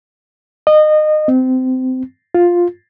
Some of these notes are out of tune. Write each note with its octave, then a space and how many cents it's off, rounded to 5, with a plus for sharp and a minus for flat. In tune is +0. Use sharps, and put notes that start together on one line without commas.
D#5 -25
C4 -25
F4 +5